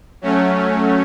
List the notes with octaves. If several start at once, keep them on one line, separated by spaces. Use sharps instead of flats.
F#3 A3 C#4